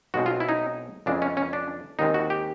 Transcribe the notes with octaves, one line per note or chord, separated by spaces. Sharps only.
B1 B2 G#3 C4 F#4
F4
E4
D#4
F2 C#3 E3 G#3 D4
C#4
C#4
D4
D#2 D#3 G#3 C4 D#4
F#4
G4